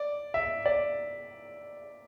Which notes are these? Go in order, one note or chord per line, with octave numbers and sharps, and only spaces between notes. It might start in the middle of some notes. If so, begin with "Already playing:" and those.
Already playing: D5
E5
D5